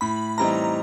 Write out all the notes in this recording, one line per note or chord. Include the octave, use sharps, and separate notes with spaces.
A2 B5
E3 G3 C4 D#4 A#5